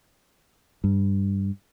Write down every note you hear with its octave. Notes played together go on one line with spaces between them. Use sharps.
G2